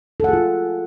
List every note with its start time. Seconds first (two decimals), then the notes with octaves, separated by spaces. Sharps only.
0.20 A4
0.24 F#5
0.29 G#4
0.33 F4